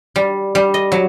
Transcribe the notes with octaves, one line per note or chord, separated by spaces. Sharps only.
G3
G3
D#5
F#3